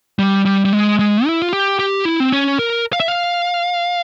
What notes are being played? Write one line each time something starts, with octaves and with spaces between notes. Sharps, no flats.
G3
G3
G3
G#3
G#3
E4
F4
G4
G4
E4
C4
C#4
A#4
F5
E5
F5